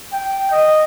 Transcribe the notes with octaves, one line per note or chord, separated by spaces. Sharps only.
G5
D#5